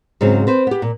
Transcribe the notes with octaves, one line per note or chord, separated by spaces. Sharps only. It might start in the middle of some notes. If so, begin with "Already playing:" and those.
G#2 C#3 F#3 G#3 C4
C4 B4 C5
B3 G4
A#2